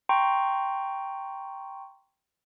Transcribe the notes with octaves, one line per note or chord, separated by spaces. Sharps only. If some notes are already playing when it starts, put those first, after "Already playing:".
G5 A#5 C6 C#6